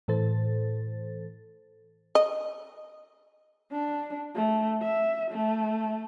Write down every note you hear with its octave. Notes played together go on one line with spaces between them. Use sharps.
A2 E3 A4 C5 A6
D#5
D4
A3
E5
A3